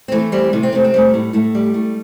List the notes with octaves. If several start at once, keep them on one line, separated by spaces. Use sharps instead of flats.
C4
E3 A3
G3 C4
C3 A3
C4
C3 A3
C4
G3 A3
A2
A2 A3
G3
A3